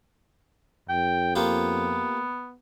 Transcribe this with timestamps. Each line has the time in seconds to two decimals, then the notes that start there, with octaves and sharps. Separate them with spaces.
0.89 F2 G5
1.35 A#3 B3 F4 G4